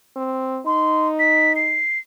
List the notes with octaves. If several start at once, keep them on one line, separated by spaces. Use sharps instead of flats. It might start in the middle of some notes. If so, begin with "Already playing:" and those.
C4
D#4 C6
B6
C7